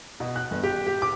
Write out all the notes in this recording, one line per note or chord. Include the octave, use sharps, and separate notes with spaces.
B2
F#6
G1
G4
G4
D6